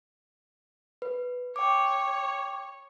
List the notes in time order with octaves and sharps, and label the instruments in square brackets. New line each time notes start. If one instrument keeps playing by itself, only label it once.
[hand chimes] B4
[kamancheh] C#5 [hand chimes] G5 D6